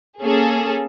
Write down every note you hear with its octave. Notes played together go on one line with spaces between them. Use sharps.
A#3 C#4 G#4 A4